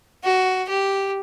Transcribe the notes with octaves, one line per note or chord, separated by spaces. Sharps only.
F#4
G4